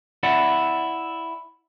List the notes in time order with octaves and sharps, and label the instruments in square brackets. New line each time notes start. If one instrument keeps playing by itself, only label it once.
[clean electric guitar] E4 D5 F#5